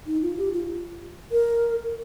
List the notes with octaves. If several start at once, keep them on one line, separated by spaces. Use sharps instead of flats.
D#4
F4
G4
F4
A#4